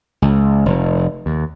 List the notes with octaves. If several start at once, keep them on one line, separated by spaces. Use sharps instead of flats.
C#2
F1
D#2